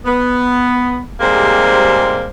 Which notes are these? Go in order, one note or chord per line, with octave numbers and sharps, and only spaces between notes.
B3
G#2 C3 G3 G#3 A#3 C5